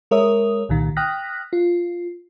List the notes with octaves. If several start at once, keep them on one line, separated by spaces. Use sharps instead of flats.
G#3 A#4 C#5 E5 D#6
C2 A#2 D#3
G5 D#6 F6 F#6 A#6 B6
F4